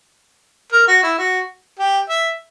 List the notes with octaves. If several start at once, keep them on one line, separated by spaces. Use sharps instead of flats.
A#4
F#4
E4
F#4
G4
E5